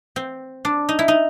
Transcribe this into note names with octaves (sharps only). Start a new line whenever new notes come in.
C4
D4
D#4
E4
D#4